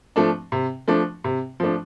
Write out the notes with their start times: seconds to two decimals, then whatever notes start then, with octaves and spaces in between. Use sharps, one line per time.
0.16 F3 A3 D4
0.52 C3
0.88 F3 A3 D4
1.24 C3
1.60 F3 A3 D4